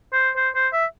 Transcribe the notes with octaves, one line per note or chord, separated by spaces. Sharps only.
C5
C5
C5
E5